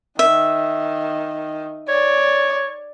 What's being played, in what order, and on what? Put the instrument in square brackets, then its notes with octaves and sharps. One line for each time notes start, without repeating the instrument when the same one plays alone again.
[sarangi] D#3 [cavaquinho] E5
[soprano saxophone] C#5 [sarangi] D5